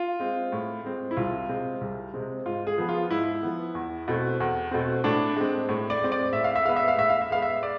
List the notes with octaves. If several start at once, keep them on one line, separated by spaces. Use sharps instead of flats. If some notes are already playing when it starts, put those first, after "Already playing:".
Already playing: F4
G#3 C4
A2
G#3 C4
E4
C2 F4
C3 G#3 C4
C2
C3 G#3 C4
G#2 F4
G#4
F3 B3
F4
G#2 E4
F3 B3
E2
B2 A3 C4
E2
B2 A3 C4
A2 D4
G#3 C4
A2
D5
G#3 C4
D5
A2 E5
F5
E5
G#3 B3 F5
E5
F5
A2 E5
F5
E5
G#3 B3 F5
E5
D5